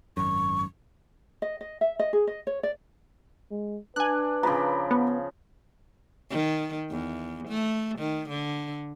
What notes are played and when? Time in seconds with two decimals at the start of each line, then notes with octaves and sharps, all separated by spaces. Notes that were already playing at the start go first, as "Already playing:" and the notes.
0.17 G#1 F#2 C#6
1.42 D#5
1.61 D#5
1.81 E5
1.99 D#5
2.13 G#4
2.27 D#5
2.47 C#5
2.63 D5
3.51 G#3
3.96 D4 B4 G#5 F#6
4.43 C#3 F3 A#5 B5 D6
4.91 B3
6.30 D#3
6.90 E2
7.48 A3
7.99 D#3
8.29 D3